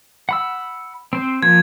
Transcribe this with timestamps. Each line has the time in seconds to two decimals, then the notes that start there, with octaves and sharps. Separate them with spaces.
0.29 F#5 B5 E6
1.13 C4 C5
1.43 F3 A#3 G#6